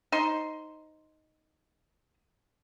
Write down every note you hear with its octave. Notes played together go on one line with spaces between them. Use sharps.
D#4 C5 C6